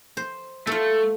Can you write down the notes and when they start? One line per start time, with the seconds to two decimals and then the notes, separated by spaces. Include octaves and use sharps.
0.17 C5
0.67 A3 F4 A4